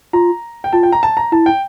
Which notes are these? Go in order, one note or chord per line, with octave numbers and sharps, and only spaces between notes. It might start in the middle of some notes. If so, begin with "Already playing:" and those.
F4 A#5
G5
F4 A5
G5
A#5
A5
A#5
E4 A5
G5